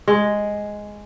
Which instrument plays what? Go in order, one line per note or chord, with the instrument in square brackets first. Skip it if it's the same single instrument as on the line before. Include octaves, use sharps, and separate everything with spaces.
[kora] G#3